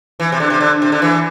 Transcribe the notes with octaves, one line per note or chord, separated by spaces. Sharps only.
E3
C3
D3
C3
D3
C3
D3
E3